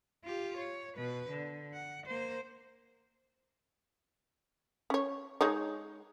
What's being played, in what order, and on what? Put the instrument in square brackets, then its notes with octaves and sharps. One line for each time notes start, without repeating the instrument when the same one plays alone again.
[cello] F4 G4
C#5
B2 B4
D3
F#5
A#3 C5
[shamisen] C#4 C#5
G#3 D#4 C#5